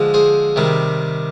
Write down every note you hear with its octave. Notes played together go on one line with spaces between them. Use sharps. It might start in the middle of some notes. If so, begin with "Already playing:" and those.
Already playing: D3 F3 G#3
G#4 C5
C3 D#3 G3